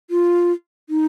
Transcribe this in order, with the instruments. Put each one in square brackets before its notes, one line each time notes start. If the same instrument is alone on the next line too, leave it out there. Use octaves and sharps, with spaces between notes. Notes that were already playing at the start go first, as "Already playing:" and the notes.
[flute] F4
D#4